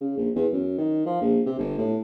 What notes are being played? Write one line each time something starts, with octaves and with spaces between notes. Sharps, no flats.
C#3
A#1
E2
F#2
D#3
F3
A#1
C3
G1
A2